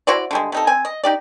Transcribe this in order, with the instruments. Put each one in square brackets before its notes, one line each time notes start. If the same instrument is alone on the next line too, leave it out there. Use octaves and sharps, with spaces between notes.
[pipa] E4 F#4 C5 D5
D3 G3 G#3
C3 D#4 A4
C4 G#5
D#5
D#4 G4 D5